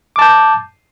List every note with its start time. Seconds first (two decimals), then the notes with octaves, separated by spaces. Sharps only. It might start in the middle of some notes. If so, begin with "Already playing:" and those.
0.16 D6
0.19 A5
0.22 G6